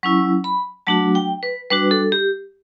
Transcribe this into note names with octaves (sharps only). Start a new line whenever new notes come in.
F#3 C#4 E4 C#6
B5
F#3 A3 D4 F#4 A5
G5
B4
G3 D4 F#4 B4
A4
G4